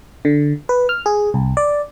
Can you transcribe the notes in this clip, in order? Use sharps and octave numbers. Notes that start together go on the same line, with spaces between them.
D3
B4
F6
G#4
C2
D5